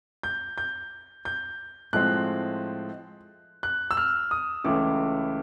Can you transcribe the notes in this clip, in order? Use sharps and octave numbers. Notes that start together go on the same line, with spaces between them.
G6
G6
G6
A2 F3 G#3 C4 F#6
F#6
E6
F6
D#6
C#2 C#3 E3 A3 D6